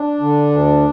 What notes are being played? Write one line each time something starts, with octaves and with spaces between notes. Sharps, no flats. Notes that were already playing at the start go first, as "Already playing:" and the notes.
Already playing: D4
D3
D2